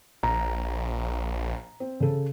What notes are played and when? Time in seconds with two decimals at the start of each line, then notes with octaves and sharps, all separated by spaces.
0.23 A#1 A#5
1.80 C4
2.00 C#3 A4